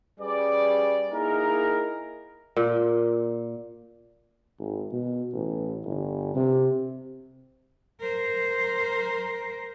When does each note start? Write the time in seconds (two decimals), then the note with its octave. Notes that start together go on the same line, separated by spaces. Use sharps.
0.20 G3 C#4 G#4 B4 D5
1.12 A#3 D#4 E4 G#4 A#4
2.56 A#2
4.60 G#1
4.93 B2
5.34 A1
5.85 G1
6.35 C3
8.01 A#4 C5